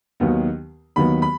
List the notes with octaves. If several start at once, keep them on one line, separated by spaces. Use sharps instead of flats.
D#2 D#3 F#3 B3
D#2 D#3 F#3 B3 B5
B5